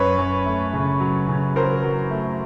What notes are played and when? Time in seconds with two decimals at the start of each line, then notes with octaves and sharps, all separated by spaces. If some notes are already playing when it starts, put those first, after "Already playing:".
Already playing: F#2 B4 C#5
0.18 F#2
0.46 A3
0.73 C#3
1.00 F#3
1.28 C#3
1.56 F#3 A#4 C5
1.84 F#3
2.11 A3